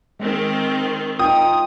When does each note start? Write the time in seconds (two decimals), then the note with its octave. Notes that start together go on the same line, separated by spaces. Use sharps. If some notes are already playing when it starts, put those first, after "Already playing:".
0.20 D#3 G#3 C4
1.19 D#4 F4 G5 D#6